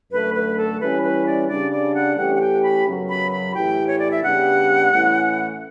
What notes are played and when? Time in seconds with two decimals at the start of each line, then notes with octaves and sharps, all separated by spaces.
0.11 F#2 D3 A3 B4
0.34 B4
0.57 A4
0.80 E3 G3 C#4 E4 B4
1.02 B4
1.26 D5
1.48 C#3 G3 D4 D5
1.71 D5
1.94 F#5
2.17 E3 A3 C#4 G4 F#5
2.35 F#5
2.41 G5
2.63 B5
2.85 F#2 C#3 F#3 B3
3.09 B5
3.31 B5
3.54 A2 E3 A3 E4 G4 G5
3.87 C#5
3.99 D5
4.11 E5
4.22 C#3 G3 B3 D4 G4 F#5
4.92 A2 E3 A3 C#4 E4